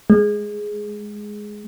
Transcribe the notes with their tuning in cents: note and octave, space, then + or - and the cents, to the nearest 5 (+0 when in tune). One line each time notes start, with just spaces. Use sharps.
G#3 +5